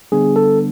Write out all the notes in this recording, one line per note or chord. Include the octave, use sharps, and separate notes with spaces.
D3 G3 B3 D4 G#4
A4